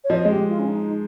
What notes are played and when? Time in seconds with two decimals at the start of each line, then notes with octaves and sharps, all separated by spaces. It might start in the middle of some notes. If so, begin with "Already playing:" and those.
0.04 C#5
0.10 F3 D#5
0.25 G#3
0.30 G4
0.49 F4
0.59 C#4
0.68 D#4